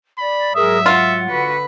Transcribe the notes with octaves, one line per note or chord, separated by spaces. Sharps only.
D5 B5
G#2 F#3 G#4 A#4 E5 D#6
F4 F#5
D3 F#4 B4